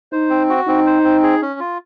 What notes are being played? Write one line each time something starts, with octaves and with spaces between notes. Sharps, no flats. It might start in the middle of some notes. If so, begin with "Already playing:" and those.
D#4 C5
C4
F#4
C4 D#4
C5
C4
G#4
C#4
F4